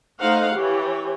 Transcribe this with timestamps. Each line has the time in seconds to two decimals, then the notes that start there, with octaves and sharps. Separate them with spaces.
0.20 A3 D#4 C5 F5 F#5
0.56 E3 G4 C#5